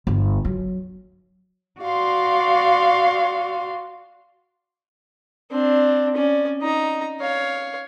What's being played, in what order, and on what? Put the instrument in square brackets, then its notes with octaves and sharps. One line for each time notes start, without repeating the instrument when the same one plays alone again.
[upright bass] G1
F#3
[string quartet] F#4 D5 F5 C6
[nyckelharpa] C4 D4
C#4 D5
D#4 A#5
C#5 F5